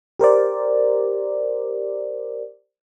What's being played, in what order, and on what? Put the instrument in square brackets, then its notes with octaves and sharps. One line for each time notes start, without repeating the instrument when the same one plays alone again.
[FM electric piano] G4 A#4 C5 D5